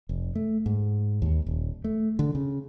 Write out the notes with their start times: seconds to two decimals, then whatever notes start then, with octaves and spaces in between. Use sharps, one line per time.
0.09 F1
0.35 A3
0.66 G#2
1.22 D#2
1.47 D#1
1.84 A3
2.19 D3
2.35 C#3